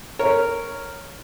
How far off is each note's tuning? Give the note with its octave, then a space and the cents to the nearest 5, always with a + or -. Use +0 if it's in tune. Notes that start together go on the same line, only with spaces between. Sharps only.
A#4 -5 C#5 +0